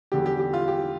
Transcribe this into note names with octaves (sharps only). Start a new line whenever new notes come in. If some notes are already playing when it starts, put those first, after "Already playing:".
E2 D3 G3 G4
G4
G4
F4
G4